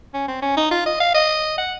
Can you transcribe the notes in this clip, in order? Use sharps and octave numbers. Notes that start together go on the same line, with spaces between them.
C#4
C4
C#4
D#4
F4
D#5
F5
D#5
F#5